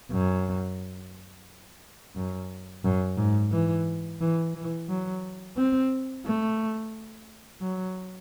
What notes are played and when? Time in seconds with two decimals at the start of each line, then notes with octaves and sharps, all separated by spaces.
0.11 F#2
2.16 F#2
2.85 F#2
3.18 G#2
3.52 E3
4.21 E3
4.55 E3
4.89 F#3
5.57 C4
6.26 A3
7.61 F#3